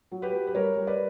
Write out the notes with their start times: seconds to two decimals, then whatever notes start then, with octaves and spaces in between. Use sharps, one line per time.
0.12 F#3
0.22 G4 B4
0.33 F#3
0.47 B4
0.54 G3 A#4 C#5
0.76 G3
0.87 B4 D5